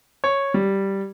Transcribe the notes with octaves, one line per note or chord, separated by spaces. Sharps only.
C#5
G3